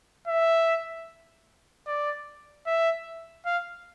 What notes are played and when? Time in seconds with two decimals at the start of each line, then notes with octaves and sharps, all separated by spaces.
0.28 E5
1.87 D5
2.66 E5
3.46 F5